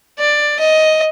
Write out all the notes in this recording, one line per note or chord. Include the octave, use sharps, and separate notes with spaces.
D5
D#5